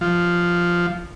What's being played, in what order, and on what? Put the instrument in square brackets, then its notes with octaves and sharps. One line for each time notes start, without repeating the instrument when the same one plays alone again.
[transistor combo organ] F3